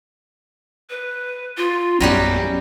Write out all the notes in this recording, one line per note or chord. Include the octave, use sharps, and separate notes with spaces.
B4
F4
A#1 F#2 F#3 G3 B3 C#4 G4